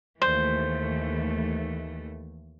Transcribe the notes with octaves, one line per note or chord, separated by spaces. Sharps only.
D#2 E3 A3 C5